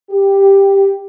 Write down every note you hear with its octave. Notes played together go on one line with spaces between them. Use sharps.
G4